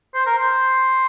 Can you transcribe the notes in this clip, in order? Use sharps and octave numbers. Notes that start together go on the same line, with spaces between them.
C5
A#4
C5